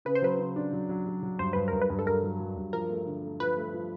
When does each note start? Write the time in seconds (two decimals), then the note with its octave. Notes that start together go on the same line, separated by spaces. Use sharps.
0.05 C#3 B4
0.15 C5
0.22 F#3 B4
0.39 C#3
0.56 D4
0.73 F#3
0.89 F#3
1.07 F#3
1.23 F#3
1.39 G2 C5
1.53 G2 B4
1.68 G2 A#4
1.82 B4
1.90 G2
1.99 A4
2.06 G2 A#4
2.23 F#3
2.40 F#3
2.57 G2
2.73 F3 A#4
2.90 A3
3.06 D3
3.24 A3
3.40 F3 B4
3.57 A3
3.74 F3